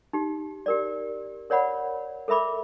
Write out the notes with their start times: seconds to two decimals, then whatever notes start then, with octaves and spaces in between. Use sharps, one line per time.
0.13 D#4 G4
0.66 G4 A#4 D5
1.50 A#4 C#5 D5 F#5 B5
2.28 A4 A#4 E5 B5 D6